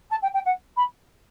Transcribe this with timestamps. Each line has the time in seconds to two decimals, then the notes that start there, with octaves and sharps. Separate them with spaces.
0.10 A5
0.22 G5
0.33 G5
0.45 F#5
0.76 B5